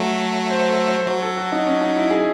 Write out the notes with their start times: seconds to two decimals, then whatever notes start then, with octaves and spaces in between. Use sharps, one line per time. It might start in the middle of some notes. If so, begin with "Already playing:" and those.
Already playing: F#3 A3
0.50 C5
0.69 A4
0.88 C5
1.08 F#3 C#5
1.22 A4
1.37 F#4
1.52 D#4
1.67 C#4
1.81 D#4
1.96 E4
2.11 G#4